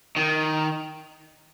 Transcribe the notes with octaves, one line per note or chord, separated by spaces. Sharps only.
D#3